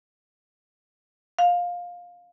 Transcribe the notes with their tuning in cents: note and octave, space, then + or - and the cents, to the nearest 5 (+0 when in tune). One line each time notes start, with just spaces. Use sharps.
F5 +15